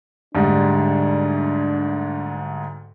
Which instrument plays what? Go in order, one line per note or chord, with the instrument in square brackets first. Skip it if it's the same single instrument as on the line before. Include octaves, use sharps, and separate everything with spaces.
[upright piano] D2 G#2 G3 [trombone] D4